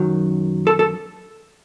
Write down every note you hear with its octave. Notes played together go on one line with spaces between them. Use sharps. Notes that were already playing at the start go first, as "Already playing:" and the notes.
Already playing: F#2 D#3 F#3
A4
A4